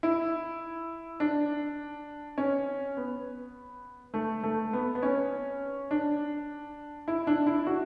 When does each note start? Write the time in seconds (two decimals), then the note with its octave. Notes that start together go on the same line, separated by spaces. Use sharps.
0.03 E4
1.20 D4
2.38 C#4
2.97 B3
4.14 A3
4.43 A3
4.73 B3
4.95 B3
5.03 C#4
5.91 D4
7.08 E4
7.27 D4
7.47 E4
7.67 F#4